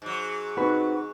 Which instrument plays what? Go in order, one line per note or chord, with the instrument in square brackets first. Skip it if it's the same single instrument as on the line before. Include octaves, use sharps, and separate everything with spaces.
[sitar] G#2 F#3
[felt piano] C4 D#4 [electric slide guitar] F#4 B4